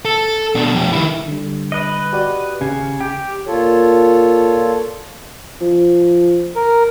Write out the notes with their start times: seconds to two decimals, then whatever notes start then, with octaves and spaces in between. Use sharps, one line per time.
0.05 A4
0.55 B2 D4
0.73 F2 G4
0.92 D#3 E4
1.28 D3 G3
1.72 B4 D#5
2.13 F#4 G4 D5
2.61 G#1 C#3 G4 G#6
3.01 G4 G5
3.47 A#2 F4 A4 C#5
5.61 F3
6.56 A#4